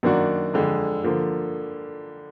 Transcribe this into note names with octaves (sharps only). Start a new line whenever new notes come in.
F#2 D#3 A#3 D4 F#4
F2 D3 G#3
D3 F3 A#3